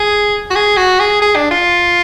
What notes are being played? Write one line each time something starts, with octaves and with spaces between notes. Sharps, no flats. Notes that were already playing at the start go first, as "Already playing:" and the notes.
Already playing: G#4
F#4
G#4
F#4
G#4
G#4
D4
F4